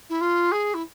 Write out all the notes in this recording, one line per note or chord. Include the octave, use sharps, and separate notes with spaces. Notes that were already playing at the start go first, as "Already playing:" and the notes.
E4
F4
G#4
E4